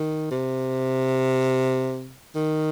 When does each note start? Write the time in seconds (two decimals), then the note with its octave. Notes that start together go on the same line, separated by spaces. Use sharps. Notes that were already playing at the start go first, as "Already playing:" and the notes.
Already playing: D#3
0.31 C3
2.35 D#3